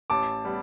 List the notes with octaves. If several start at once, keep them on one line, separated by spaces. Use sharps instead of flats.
A1 A5 D6
G3 B3